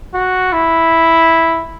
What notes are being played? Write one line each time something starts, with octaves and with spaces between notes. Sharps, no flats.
F#4
E4